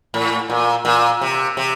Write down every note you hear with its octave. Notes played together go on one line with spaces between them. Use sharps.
A2
A#2
A#2
C3
C3